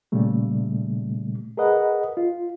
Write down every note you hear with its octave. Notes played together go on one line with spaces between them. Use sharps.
A#2 C#3 G3 A3
G#4 A#4 B4 D#5 F#5
F4